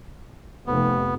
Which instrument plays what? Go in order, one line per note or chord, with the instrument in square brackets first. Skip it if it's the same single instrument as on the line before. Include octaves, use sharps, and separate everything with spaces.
[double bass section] F1 [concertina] B3